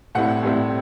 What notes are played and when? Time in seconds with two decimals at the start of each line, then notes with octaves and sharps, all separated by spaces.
0.15 A2 G3 C4 E4 F#5
0.43 A2 G3 C4 E4